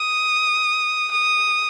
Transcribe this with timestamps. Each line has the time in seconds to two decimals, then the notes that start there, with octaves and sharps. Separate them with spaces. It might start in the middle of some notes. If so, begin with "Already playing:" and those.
Already playing: D#6
1.12 D#6